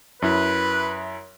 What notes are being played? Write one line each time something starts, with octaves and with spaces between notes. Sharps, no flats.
F#2 E4 B4